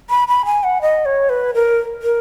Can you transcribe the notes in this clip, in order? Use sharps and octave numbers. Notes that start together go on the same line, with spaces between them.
B5
B5
G#5
F#5
D#5
C#5
B4
A#4
A#4